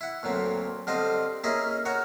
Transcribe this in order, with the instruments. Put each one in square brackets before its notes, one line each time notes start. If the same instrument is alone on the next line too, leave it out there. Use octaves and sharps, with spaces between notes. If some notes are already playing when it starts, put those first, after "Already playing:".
[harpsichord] E4 F#5
D2 A#2 F#3 C4
D3 G3 C4 F4 C5 D#5
A#3 C#4 E4 G#4 A#4 D#5
F#4 A#4 C#5 F#5